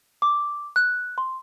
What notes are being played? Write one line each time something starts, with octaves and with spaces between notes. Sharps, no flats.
D6
F#6
C6